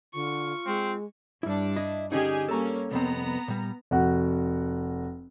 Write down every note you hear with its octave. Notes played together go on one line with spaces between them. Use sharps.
D3 F4 C#6
G#3 C4
G2 G3 D4 E4
E4 D#5
D3 C#4 D#4 G4 G#4 G#5
G3 A#3 C#4 A4 A#5
C2 F2 B3 C4 A#5
A#2 G3
F1 F#4 F#5